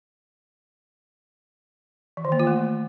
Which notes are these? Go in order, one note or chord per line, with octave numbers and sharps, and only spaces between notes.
E3
D#3
A#3
F4
A3